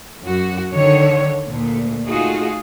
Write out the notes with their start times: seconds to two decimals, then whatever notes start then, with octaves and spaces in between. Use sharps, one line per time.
0.21 F#2 F#4
0.71 D3 D#3 C#5
1.48 D2 A#2
2.05 A3 D#4 F4 F#4 G#4